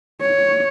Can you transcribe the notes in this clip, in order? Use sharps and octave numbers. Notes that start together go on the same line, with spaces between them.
C#5